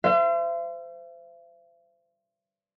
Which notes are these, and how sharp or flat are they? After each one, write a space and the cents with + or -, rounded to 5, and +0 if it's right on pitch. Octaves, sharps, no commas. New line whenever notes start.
C5 -25 E5 +45